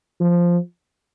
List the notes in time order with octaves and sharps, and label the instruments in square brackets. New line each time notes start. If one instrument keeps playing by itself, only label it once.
[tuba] F3